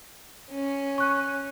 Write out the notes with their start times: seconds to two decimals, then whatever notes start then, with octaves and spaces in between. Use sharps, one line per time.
0.52 C#4
0.98 C#6 F#6